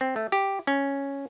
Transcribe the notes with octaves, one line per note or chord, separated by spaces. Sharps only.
C4
A3
G4
C#4